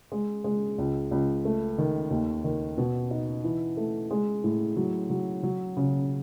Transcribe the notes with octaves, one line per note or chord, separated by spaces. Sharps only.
G#3
G#3
C#2
C#2
A3
D#3
D#2
D#3
B2
D#4
E3
A3
G#3
A2
F#3
F#3
F#3
C#3